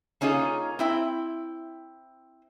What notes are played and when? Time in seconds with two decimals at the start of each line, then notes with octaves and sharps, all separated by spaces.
0.21 A#3 C#4 D#4 F4 G#4
0.79 C4 E4 G5